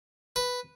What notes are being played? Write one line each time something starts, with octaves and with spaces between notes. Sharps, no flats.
B4